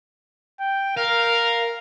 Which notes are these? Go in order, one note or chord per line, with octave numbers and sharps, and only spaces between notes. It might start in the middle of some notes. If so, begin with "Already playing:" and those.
G5
A#4 F5